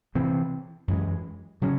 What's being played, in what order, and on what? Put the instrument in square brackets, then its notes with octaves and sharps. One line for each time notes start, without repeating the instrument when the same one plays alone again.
[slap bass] C3 E3 C4
F#2 E3 G#3
C#3 F#3 C#4